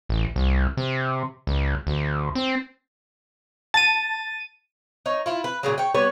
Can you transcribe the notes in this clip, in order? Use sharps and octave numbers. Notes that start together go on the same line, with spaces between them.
A1
C2
C3
C#2
D2
C4
A5 A6 D#7
D#4 C#5
E4 F4
B4
A#2 C#3 F#3
C#5 G5
G3 B3 B4 C#5